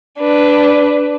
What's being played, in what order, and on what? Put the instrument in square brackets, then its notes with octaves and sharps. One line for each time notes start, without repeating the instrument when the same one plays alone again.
[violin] D4 B4